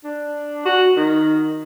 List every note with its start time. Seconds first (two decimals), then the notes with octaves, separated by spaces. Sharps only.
0.04 D4
0.65 F#4
0.96 D#3